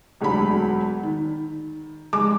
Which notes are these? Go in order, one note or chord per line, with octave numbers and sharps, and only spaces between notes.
E1 D2 D3 F#3 B5
D#3
F1 G#3 D6